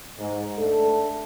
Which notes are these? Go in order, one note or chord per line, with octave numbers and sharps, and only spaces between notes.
G#2
A3 D4 A4